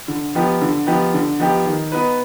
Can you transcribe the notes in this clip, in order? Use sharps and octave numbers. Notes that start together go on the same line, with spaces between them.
D3
F3 B3 D#4 G4
D3
F3 B3 D#4 G4
D3
F3 B3 D#4 G4
D#3
B3 D#4 B4